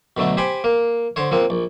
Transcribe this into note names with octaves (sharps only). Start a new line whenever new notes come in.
B2 D3 F#3 A3
G4 C5 G#5 B5 D6
A#3
D3 C5 C#5
F3 A#3 C4
A#1